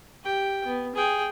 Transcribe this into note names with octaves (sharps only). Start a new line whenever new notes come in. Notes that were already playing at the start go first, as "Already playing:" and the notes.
G4 G5
B3
G#4 G5